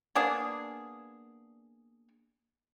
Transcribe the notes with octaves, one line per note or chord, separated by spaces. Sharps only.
A#3 B3 D4 G#4